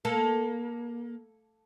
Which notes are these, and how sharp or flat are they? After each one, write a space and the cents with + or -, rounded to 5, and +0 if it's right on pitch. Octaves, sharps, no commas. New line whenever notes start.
A#3 +25 A4 +0